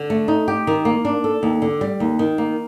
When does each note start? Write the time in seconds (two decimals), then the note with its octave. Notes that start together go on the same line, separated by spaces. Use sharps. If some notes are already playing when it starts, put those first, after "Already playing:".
Already playing: D3
0.10 A3
0.28 D#4
0.48 G4
0.67 D#3
0.85 A#3
1.05 D4
1.24 A4
1.43 D#2
1.62 D3
1.81 G3
2.00 D#2
2.19 D#3
2.38 A#3